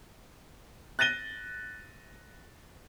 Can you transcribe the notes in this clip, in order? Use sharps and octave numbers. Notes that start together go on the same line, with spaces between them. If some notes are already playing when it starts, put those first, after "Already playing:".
F#6 A6 A#6 D#7 G7